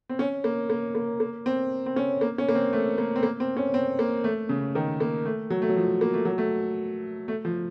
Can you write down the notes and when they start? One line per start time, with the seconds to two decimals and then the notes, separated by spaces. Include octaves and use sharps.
0.09 C4
0.19 C#4
0.44 A#3
0.70 A#3
0.95 A#3
1.20 A#3
1.46 C4
1.86 C4
1.96 C#4
2.21 A#3
2.38 C#4
2.49 A#3
2.55 C4
2.73 A3
2.98 A#3
3.16 C4
3.23 A#3
3.40 C4
3.56 C#4
3.74 C4
3.99 A#3
4.24 A3
4.49 C#3
4.75 D#3
5.00 A#3
5.25 A3
5.50 F#3
5.62 A3
5.69 F#3
5.76 F3
6.01 A#3
6.14 A3
6.25 F#3
6.38 A3
7.28 A3
7.45 F3